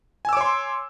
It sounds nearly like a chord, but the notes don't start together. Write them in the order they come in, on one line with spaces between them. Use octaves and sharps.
G#5 E6 D6 C#5 C6